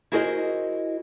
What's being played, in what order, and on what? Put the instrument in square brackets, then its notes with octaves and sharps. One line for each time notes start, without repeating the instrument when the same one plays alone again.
[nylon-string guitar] E4 F#4 G#4 A#4 C5 D#5